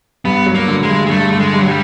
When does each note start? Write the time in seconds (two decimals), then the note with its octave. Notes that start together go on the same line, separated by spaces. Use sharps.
0.25 G2 B3
0.47 F#3
0.54 A#3
0.68 D3
0.83 G#3
0.89 G2
1.06 G#3
1.11 G2 A3
1.33 D3 A3
1.39 G#3
1.54 G2
1.60 F#3
1.68 G3